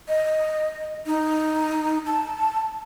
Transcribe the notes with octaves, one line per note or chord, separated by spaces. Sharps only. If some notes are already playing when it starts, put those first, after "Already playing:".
D#5
D#4
A5